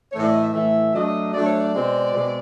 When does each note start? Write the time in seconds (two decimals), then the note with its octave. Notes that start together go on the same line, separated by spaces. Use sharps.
0.12 A2 E3 A3 C#5
0.23 D5
0.33 D#5
0.42 E5
0.53 A2 E3 A3 E5
0.93 F#3 A3 D4 D#5
1.33 F#3 A3 D4 D5
1.47 C#5
1.60 D5
1.74 B2 G#3 C4
2.14 B2 G#3 C4